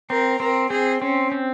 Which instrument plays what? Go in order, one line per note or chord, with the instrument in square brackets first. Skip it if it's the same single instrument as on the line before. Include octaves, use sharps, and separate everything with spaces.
[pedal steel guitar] C4 [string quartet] A#4
[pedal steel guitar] C4 [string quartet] A#4
[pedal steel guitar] C4 [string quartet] G#4
[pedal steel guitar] C4 [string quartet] C#4
[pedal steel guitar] C4